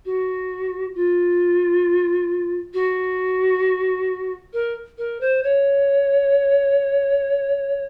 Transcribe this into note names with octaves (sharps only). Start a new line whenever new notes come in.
F#4
F4
F#4
A#4
A#4
C5
C#5